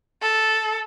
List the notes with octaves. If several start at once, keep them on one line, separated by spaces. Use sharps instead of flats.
A4